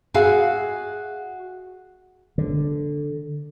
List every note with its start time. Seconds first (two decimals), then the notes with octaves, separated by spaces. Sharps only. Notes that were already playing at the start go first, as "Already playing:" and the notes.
0.14 F#4 G#4 E5 F5 G#5
2.38 D3